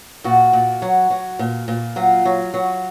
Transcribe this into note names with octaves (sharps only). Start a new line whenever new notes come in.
A#2 F#4
A#2
F#3
F#3
A#2
A#2
F#3 F4
F#3
F#3